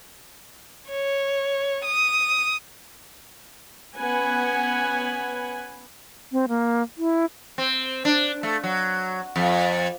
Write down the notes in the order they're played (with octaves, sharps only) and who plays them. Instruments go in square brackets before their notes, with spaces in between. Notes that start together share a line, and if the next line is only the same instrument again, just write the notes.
[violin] C#5
D#6
[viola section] B3 C#4 B4 F#5 G#5
[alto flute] C4
A#3
E4
[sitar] C4
D4
A3
F#3
F2